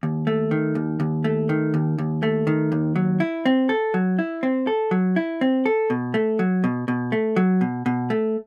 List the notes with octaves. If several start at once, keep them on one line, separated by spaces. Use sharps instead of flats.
D#2
A3
D#3
D#2
D#2
A3
D#3
D#2
D#2
A3
D#3
D#2
F#3
E4
C4
A4
F#3
E4
C4
A4
F#3
E4
C4
A4
B2
A3
F#3
B2
B2
A3
F#3
B2
B2
A3